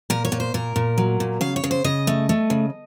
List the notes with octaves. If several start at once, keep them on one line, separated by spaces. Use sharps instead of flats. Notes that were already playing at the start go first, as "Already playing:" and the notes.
A#2 A#4
C#5
A#2
C5
A#2 A#4
A#2
F#3
A#2
C#3 F5
C#5
C#3
C5
C#3 D#5
A3
A3
C#3